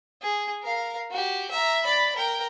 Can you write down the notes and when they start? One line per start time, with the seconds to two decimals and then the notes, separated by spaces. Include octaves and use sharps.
0.22 G#4
0.63 A#4 F5
1.11 F#4 G4
1.51 E5 A#5
1.84 D5 B5
2.16 A#4 G5